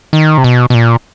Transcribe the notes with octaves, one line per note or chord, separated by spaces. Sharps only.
D#3
C3
B2
B2
A#2